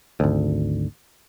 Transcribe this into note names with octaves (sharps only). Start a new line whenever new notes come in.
G#1 D2